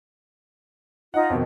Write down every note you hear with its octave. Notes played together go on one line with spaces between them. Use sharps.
D#4 F4 D#5 F#5
F2 B2 D#3